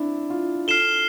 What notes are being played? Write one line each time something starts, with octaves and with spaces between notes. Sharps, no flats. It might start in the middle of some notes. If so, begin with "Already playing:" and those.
Already playing: C4 D4 E4
F4
A4 F6 C7 E7 G7